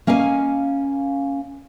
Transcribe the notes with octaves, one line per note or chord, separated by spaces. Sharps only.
A#3 C#4 D#5 F5 F#5 G#5